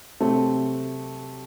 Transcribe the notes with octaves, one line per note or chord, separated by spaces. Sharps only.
C3 F#3 A3 C4 G4